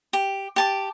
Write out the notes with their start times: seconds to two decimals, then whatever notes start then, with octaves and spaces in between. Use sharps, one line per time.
0.13 G4
0.56 G4 A5 D6